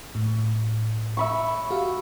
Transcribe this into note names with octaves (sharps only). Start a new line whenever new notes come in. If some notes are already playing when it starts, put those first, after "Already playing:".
A2
E5 B5 C#6
F#4 G4 F5